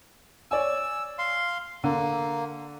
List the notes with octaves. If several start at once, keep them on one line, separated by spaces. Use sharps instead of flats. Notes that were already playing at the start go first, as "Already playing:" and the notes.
C#5 D5 G#5 E6
F5 C6
D3 A#3